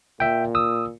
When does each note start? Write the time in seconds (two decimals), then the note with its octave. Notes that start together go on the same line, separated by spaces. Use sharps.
0.20 A#2 E5 G5
0.55 D#6 E6